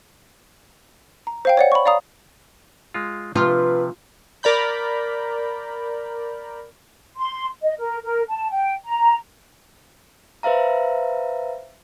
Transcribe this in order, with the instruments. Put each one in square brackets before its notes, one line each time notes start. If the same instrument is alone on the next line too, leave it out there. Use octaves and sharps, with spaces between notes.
[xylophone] A#5
C5 F5 G5
C#5 D5 F#5
B5 C#6
D5 F5 A#5 D#6
[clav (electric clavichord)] G#3 F4
[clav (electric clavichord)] C3 F3 [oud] F4 [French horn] B4
[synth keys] A#4 D5 B5 G6
[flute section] C6
D#5
A#4
A#4
A5
G5
A#5
[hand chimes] B4 C5 E5 F5 A#5